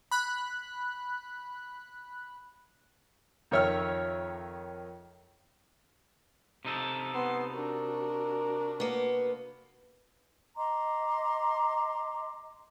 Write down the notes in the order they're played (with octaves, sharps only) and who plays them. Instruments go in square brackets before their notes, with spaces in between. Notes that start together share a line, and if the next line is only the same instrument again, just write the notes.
[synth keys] B5 F#6
[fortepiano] F2 D#3 C#5 E5 F6
[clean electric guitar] C3 D#4 A4
[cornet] B3 [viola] C6
[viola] D4 F#4 [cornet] A#4
[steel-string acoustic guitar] A#3 B3
[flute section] D#5 A#5 C6 D6